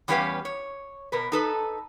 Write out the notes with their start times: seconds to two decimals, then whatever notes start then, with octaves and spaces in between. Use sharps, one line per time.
0.08 E2 G3 C#4 G4 B4 F5
0.45 C#5
1.12 B2 A#4 B4
1.32 D#4 A4 B4